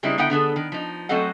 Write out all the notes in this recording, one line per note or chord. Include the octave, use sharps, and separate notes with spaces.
C#3 G3 G#3 C4 D#4 E4
D3 B3 D#4 E4 F#5 G5
D3 B3 G#4 A4
D#3
F3 D#4
F#3 A3 C4 A4 D#5 F#5